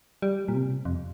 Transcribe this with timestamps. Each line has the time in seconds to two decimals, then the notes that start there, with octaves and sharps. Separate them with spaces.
0.22 G3
0.48 A#2
0.54 C3
0.85 F2